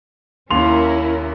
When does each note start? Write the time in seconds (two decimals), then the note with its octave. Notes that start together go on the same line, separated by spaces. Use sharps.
0.50 D#2 C#4 E4 A#4 C6 F7